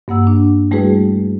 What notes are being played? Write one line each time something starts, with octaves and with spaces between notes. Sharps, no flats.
G2 A#3 F#5 E6
D4
G3 A3 E4 F#4 G#4 B4